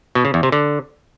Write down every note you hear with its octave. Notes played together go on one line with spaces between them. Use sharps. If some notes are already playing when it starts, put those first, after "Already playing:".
B2
C#3
E2
C3
D3